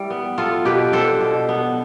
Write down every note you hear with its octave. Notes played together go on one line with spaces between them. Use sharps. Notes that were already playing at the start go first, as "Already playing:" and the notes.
Already playing: G3 E4
B3
B3 F4 A4
B2 G4 B4
D4 A4 C5
B2
B3